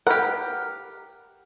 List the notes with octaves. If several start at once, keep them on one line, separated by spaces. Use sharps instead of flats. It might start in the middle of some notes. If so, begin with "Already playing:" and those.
G4 A#4 B4 F#5